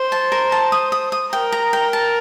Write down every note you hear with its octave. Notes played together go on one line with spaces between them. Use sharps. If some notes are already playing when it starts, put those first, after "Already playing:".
Already playing: C5
A5
A#4
A5
D#6
D#6
D#6
A#4 G5
A#5
G5
A5